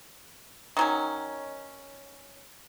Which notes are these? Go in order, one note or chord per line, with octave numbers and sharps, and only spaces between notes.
D#3 F#3 C#4